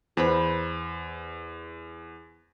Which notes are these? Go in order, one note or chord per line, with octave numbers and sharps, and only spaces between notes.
E2 B4 C5 B5